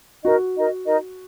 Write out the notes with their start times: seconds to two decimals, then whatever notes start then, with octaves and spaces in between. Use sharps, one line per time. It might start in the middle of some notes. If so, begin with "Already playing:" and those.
0.25 D#4 F#4 A#4 D#5
0.55 D#4 A#4 D#5
0.85 D#4 A#4 D#5